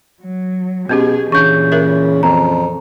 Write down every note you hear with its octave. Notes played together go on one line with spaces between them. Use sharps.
F#3
B2 B3 C#4 G4 G#4
A#2 C#3 E3 D4 C#6 G6
A#4 C#5 E5
F2 A#5